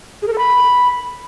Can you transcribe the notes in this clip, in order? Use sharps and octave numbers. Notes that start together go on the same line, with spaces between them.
G#4
A#4
A4
B5